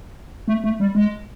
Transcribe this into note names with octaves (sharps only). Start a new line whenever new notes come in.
A3
A3
G3
G#3